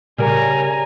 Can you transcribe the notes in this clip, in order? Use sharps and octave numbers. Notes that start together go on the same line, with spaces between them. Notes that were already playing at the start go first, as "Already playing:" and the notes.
C#3 G3 A#4 G#5 A#5